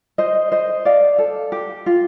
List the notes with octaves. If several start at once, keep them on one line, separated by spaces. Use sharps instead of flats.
C5 D#5
C5 D#5
D5 F5
A4
G4
F4